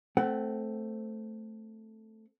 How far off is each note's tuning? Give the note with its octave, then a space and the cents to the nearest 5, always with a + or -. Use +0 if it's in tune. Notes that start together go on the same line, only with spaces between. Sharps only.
A3 +0 C4 +0 F#5 +25